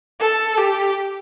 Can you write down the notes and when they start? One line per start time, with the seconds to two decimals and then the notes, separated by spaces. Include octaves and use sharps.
0.20 A4
0.58 G4